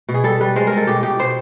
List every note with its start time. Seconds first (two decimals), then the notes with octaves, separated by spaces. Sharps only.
0.09 B2
0.14 G#4
0.24 G3 A4
0.41 G3 B4
0.56 G#3 C5
0.67 G#3 A#4
0.77 A4
0.87 B2 G4
1.03 B2 G4
1.19 B2 C5